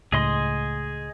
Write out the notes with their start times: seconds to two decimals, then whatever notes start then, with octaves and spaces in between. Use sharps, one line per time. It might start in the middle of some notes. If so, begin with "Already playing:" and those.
0.12 C#2 A2 G#4 D#5 C6